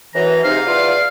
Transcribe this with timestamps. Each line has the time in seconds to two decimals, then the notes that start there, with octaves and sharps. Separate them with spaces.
0.15 F#2 E3 A#5
0.44 G#2 C3 D#4 F5
0.66 E2 F4 D5